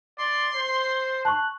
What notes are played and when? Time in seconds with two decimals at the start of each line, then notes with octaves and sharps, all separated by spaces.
0.19 D5 C6
0.55 C5
1.25 A5 C#6 F#6